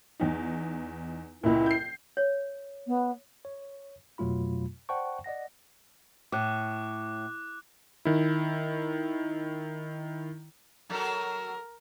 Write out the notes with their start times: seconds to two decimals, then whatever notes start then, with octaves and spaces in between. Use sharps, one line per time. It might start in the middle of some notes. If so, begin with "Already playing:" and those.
0.20 E2 D#4
1.43 C#2 A#2 E4
1.66 G6 C7
2.17 C#5
2.87 B3
3.45 C#5
4.18 F2 B2 F#3 A3 F4 B5
4.89 C5 D5 F#5 G5 A5 C#6
5.24 D5 D#5 F#5 A#6
6.32 A2 D6 F#6
8.05 D#3 E4
10.90 F#3 A4 A#4